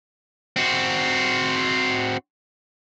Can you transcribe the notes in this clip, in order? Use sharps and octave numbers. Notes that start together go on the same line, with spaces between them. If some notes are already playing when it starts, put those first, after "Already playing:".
C4 F#4